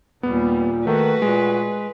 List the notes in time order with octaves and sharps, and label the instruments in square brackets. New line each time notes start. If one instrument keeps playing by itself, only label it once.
[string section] D#2 G3 [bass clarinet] A#2 [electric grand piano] B3
[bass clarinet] D#3 [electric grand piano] A3 [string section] F#4 [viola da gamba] B4
[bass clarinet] A#2 [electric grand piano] G#3